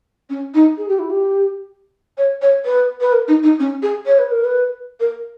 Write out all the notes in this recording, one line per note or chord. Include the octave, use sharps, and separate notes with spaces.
C#4
D#4
G#4
G4
E4
G4
C#5
C#5
B4
B4
A#4
D#4
D#4
C#4
G#4
C#5
B4
A#4
B4
A#4